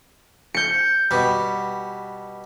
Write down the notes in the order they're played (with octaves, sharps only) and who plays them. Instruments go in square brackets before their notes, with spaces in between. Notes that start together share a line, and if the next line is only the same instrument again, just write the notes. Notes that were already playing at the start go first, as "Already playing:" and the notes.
[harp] G6 C#7
[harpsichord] B2 G3